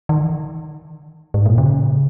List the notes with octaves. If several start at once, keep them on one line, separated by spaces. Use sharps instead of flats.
D#3
G#2
A#2
C#3